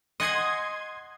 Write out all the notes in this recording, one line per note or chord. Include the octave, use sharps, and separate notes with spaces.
D#5 F#5 G#5 C6 D#6 G#6